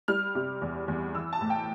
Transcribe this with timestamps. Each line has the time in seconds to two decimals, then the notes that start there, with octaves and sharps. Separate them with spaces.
0.08 G3 F6
0.35 C3
0.62 E2
0.88 E2
1.15 E3 E6
1.33 A5
1.41 A2
1.50 G5